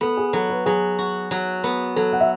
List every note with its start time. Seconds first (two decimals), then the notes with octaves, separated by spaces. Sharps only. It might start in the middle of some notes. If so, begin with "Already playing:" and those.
0.01 B3 A4
0.17 G#4
0.33 F#3 A4
0.50 B4
0.66 F#3 G#4
0.98 F#4
1.31 F#3
1.64 B3
1.96 F#3 A4
2.13 F#5
2.21 E5